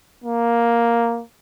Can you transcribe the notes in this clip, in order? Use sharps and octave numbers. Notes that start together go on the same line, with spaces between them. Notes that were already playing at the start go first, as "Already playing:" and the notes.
A#3